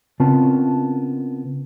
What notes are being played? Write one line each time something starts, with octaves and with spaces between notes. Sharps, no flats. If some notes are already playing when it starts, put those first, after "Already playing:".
C#3 B3 C4 F4 A#4 A5